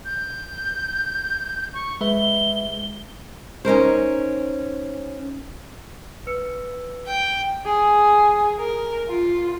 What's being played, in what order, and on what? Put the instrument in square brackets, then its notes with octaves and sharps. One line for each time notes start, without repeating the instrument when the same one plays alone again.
[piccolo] G6
C#6
[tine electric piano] G#3 B4 E5 [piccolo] G7
[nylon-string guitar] C#4 D#4 A#4 C5
[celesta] B4 E6 C#7
[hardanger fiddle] G5
[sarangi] G#4
A#4
F4